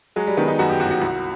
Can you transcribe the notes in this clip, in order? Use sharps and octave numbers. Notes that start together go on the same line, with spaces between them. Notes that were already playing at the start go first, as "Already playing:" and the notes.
F#3 G#3
G3
D#3 B3
D#4
F#2 F#4
G4
G1 F#4
F#4
C2